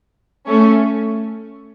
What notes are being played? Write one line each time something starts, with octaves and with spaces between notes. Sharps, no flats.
A3 C#4